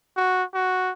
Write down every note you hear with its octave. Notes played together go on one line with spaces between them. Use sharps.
F#4
F#4